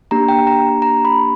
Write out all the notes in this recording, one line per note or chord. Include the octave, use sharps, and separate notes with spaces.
A#3 D4 G4 A#5
G5
A#5
A#5
B5